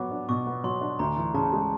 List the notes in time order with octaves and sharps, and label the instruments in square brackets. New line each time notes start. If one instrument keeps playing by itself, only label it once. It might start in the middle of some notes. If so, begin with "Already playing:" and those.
Already playing: [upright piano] F#3 B3 [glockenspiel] D6
[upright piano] D4
[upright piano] B2 [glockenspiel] C#6
[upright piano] B3
[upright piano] F#3 [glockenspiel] C6
[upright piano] D4
[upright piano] D2 [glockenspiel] A#5
[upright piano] E3
[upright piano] C#3 [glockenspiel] A5
[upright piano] G#3